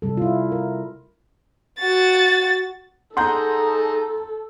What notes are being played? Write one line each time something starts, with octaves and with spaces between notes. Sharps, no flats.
C3 G3 A4
E4 F4
A#4
F#4 A6
D#4 G#4 A4 F#5 A#5 C6 G6